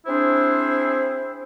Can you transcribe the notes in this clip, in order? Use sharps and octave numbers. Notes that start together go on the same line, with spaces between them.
C4 D4 E4 G#4 C5